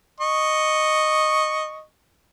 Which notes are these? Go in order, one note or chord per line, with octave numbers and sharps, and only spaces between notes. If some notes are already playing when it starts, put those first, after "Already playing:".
D#5 C#6